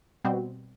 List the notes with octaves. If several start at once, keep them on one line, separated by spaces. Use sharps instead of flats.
B2 G3 C4 F#4